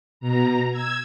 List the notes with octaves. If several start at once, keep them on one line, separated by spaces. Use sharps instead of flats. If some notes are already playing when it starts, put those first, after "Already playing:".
B2 A#5
E6 G#6